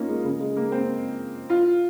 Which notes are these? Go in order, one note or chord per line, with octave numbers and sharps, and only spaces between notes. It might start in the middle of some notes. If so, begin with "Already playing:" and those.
Already playing: A#3 C#4 D#4 F4
G#3
C#3
G#3
A#3
C4
F4